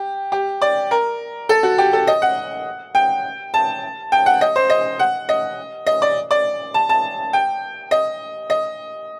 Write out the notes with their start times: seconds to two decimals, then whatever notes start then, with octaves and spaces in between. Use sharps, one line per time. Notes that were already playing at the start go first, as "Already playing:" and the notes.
Already playing: G4
0.32 G4
0.62 D5
0.91 A#4
1.49 A4
1.63 F#4
1.78 G4
1.93 A4
2.07 D#5
2.22 F#5
2.95 G5
3.54 A5
4.12 G5
4.26 F#5
4.41 D#5
4.56 C5
4.70 D#5
4.99 F#5
5.29 D#5
5.87 D#5
6.02 D5
6.31 D5
6.74 A5
6.89 A5
7.33 G5
7.91 D#5
8.50 D#5